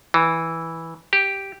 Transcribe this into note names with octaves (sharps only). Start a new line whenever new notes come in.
E3
G4